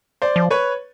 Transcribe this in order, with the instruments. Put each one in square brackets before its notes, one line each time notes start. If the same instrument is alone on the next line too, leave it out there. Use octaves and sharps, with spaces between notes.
[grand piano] C5 D5
[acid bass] F3
[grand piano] B4 C#5